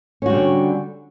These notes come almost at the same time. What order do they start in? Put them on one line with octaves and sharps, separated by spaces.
C#4 F#4 G3 D3